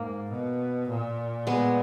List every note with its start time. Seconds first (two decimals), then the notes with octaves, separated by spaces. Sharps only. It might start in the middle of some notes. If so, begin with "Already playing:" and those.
Already playing: G#2 A#3
0.31 B2
0.89 A#2
1.47 G#3 B3